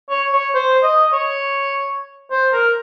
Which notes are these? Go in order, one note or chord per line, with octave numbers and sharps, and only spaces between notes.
C#5
C#5
C5
D#5
C#5
C5
A#4